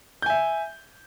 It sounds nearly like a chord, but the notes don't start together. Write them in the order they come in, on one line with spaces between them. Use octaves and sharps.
G6 G#5 E5